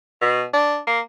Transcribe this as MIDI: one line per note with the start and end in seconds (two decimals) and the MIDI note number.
0.21 0.44 47
0.53 0.78 62
0.87 1.00 58